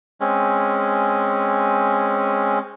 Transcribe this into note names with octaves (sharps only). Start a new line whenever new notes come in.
G#3 C4 C#4